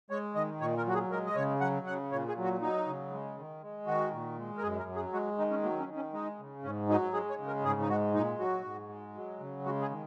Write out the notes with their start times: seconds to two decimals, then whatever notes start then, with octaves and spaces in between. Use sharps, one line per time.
0.10 G#3 C#5
0.35 D#3 D#5
0.61 A#2 C#5
0.78 A#4
0.86 F#3 F#4
0.94 G#4
1.10 G#3 A#4
1.26 D#5
1.36 C#3 C#5
1.61 F#3 F#5
1.86 C#3 F#5
2.12 A#2 C#5
2.28 G#4
2.37 F#3
2.44 F#4
2.61 F#3 D#4
2.87 C#3
3.11 G#3
3.37 D#3
3.62 G#3
3.87 D#3 F#4
4.12 A#2
4.38 G#3
4.58 A#4
4.63 F#2 G#4
4.79 A#4
4.88 F#3
4.96 G#4
5.13 G#3 F#4
5.38 D#3 D#4
5.50 C#4
5.63 F#3 A#3
5.80 C#4
5.88 D#3
5.96 C#4
6.13 G#3 D#4
6.39 C#3
6.63 G#2 C#4
6.89 F#3 D#4
7.13 G#3 G#4
7.30 C#5
7.38 C#3
7.47 A#4
7.64 G#2 G#4
7.80 D#4
7.89 G#3 F#4
8.14 A#2 D#4
8.39 F#3 F#4
8.64 G#2
8.89 G#3
9.14 F#3
9.40 C#3
9.65 G#3 F#4
9.82 G#4
9.91 D#3